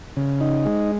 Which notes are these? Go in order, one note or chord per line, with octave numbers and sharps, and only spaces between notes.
C#3
D#4
G#3